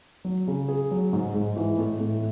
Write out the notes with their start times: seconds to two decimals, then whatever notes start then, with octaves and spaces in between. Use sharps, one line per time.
0.25 F#3
0.48 C#3
0.68 G#4
0.91 F#3
1.13 G#2
1.35 G#2
1.57 E3
1.78 A2
2.00 A2